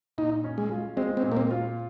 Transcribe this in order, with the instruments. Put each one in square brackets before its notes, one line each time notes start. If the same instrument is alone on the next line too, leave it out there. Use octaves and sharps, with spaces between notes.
[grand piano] A#2 [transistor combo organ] D#4
[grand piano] C#4
[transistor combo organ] G#3
[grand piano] F4
[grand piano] G#3 [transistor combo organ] C4
[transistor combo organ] C4
[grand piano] A#2
[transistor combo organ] A#3
C4
[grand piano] F4